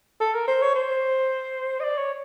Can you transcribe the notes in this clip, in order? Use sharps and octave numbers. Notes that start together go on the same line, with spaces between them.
A4
A#4
C5
C#5
C5
D#5
D5
C#5